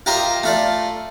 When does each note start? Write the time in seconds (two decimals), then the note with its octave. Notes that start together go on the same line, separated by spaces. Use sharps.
0.06 F4 G4 A#4 D#5 E5
0.44 A3 F4 D5